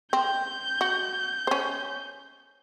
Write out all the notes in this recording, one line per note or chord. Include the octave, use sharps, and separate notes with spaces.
C4 G6
F#4
C#4 C5